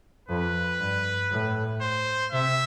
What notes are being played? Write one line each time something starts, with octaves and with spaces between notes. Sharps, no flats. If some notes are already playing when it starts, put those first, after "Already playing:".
F2 B4
G2
A2
C5
C3 E5